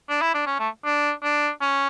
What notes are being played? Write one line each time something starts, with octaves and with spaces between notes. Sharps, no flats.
D4
E4
D4
C#4
A3
D4
D4
C#4